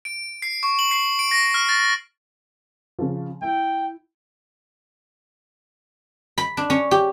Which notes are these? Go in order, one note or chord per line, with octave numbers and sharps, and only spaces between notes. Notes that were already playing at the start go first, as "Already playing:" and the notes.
D7
C7
C#6
F#7
C7
D7
A#6
F6
A6
C#3 F3
E4 G5
B5
D4
C#4
G4